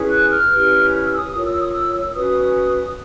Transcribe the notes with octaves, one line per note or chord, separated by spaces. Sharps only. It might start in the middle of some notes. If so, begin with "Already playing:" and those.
Already playing: C#4 E4 G#4 B4
F#6
F6
C#4 E4 G4 B4
F6
E6
D#6
F4 A#4 C#5 D#6
E6
D#6
E6
E6
E6
C#4 F#4 B4 D#6